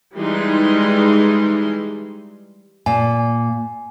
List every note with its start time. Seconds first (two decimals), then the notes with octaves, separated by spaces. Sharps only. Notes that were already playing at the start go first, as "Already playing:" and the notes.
0.16 E3 G3 G#3 D#4 C6
2.86 A#2 G#5